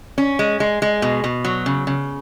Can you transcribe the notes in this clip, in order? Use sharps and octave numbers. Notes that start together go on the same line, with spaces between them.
C#4
G#3
G#3
G#3
B2
B2
F#3
C#3
C#3